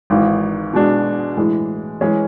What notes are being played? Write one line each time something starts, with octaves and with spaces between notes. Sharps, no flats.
G#1 G#2 E3
B2 G#3 D4
A2 E3 G#3
E3 G#3 C#4 G#4